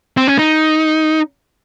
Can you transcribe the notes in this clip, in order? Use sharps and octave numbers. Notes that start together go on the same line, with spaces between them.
C4
C#4
D#4